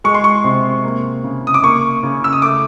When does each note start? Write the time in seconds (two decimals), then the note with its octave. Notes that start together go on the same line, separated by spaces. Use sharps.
0.04 G#3 C#6
0.14 C6
0.24 C#6
0.44 C3
0.84 A#3
1.24 C#3
1.47 D#6
1.54 D6
1.63 A#3 C#6
2.03 C#3
2.24 E6
2.33 D#6
2.42 A3 D6